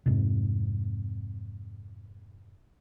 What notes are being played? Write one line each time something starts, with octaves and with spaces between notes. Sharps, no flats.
F2 G#2 C3